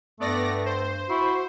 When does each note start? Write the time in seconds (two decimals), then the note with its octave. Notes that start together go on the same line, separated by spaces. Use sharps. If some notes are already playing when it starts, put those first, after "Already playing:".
0.20 G2 A3 B3 D5 A#6
0.66 C5
1.09 E4 F#4